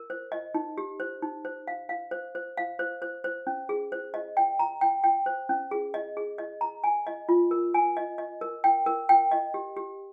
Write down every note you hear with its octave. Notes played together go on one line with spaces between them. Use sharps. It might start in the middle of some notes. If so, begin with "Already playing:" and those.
Already playing: A#4
C5
D#5
D#4
G4
C5
D#4
C5
F5
F5
C5
C5
F5
C5
C5
C5
C#4
G#4
C5
D#5
G5
A#5
G5
G5
C5
C#4
G#4
D#5
G#4
D#5
A#5
G#5
D#5
F4
A#4
G#5
D#5
D#5
A#4
G5
A#4
G5
D#5
G4
G4